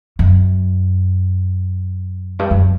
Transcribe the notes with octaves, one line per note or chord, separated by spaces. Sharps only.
F#2
G2
F#2